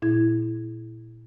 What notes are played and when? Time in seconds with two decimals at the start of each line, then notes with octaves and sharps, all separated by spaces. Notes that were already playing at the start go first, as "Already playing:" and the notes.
0.02 A#2 E4 G#6